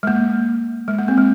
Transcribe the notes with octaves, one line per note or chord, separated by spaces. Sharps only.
G#3
A#3
G#3
A#3
C4
G#3